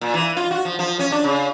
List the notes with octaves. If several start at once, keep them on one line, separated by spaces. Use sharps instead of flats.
A#2
E3
F4
F#4
F3
F3
C#4
D4
C#3